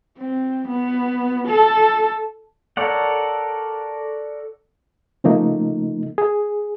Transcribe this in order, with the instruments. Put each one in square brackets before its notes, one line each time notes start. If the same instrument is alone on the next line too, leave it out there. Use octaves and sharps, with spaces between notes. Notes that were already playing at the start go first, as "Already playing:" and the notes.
[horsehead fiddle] C4
B3
A4
[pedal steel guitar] A4 A#4 C#5 D5 F#5
[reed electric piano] C#3 F3 A3 A#3 D#4
G#4